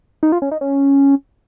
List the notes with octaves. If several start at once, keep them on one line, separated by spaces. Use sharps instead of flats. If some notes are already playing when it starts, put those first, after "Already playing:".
D#4
F4
C#4
D#4
C#4